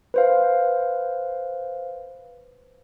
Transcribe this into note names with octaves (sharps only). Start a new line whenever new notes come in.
B4 C5 F5